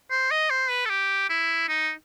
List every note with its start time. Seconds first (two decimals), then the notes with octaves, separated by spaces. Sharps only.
0.11 C5
0.31 D#5
0.50 C5
0.70 B4
0.85 A4
0.89 G4
1.29 E4
1.69 D#4